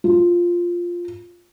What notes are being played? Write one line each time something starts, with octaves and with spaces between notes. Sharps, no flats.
F4